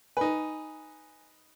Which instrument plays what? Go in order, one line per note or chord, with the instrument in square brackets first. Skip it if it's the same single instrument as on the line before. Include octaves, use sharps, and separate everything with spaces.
[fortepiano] D#4 B4 [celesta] G#5